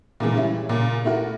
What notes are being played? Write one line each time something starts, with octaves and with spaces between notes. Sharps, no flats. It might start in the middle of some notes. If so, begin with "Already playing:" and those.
A#2 C#3 E3 G#3
G3 C#4 E4
A#2 C#3
A3 E4 F#4 A#4